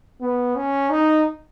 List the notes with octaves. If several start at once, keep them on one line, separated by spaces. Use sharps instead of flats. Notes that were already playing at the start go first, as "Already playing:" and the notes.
B3
C#4
D#4